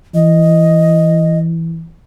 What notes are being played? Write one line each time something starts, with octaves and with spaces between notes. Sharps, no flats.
E3 D#5